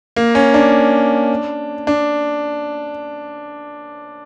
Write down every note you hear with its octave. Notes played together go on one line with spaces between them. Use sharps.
A#3
C#4
D4
D4